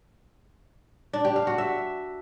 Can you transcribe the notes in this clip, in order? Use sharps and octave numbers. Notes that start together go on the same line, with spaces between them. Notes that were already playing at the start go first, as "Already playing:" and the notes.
D4
G4
F5
F#4
E5